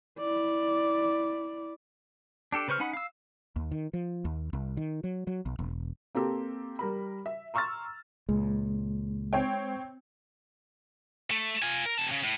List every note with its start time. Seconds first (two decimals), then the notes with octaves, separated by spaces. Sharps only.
0.19 E4 D5
2.52 D4 G4 A4
2.68 C#3 B4 C5 C#6 F6
2.80 C#4 D#4 F#5 B5
2.93 F5 E6
3.56 D#2
3.71 D#3
3.93 F3
4.25 D#2
4.53 C2
4.77 D#3
5.04 F#3
5.27 F#3
5.46 B1
5.59 E1
6.15 A#3 C4 G4 A4
6.79 G3 A#4 B5
7.26 E5
7.54 A#5 C6 C#6 E6 F6 A6
8.29 C#2 A#2 G#3
9.33 C4 C#5 G5
11.31 A3
11.62 F4 G#5
11.86 A#4
11.98 C3 A5
12.11 C#3
12.24 A2